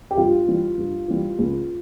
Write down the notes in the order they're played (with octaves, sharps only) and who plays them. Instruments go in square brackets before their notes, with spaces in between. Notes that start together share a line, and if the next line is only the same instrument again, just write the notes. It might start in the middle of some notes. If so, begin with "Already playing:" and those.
[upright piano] G4
G2 F4
E3 G3
G2
E3 G3
C#2